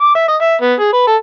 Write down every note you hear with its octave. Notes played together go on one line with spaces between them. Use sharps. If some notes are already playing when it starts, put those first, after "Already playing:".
D6
E5
D#5
E5
B3
G#4
B4
A4